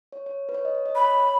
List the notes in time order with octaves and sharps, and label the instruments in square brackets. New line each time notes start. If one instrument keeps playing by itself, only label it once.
[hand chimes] C#5
C#5
B4
C#5
D#5
C#5
D#5
[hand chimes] C#5 [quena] B5